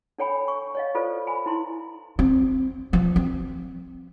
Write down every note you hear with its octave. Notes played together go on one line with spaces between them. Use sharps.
D4 A4 C#5 G5 G#5 B5
C#6
C#5 D#5 F5
F4 A4 B4 C5 D5
G#5 B5
D#4 E4 A#5 C6
C4
F3
C4